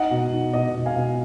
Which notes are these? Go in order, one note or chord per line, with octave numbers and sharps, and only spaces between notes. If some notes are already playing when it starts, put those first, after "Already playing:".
Already playing: D#4 D#5 F#5
B2
D#4
B2 D#5
B2
F5 G#5
B2